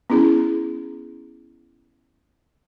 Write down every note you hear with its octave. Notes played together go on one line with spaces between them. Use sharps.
B3 C#4 E4 G#4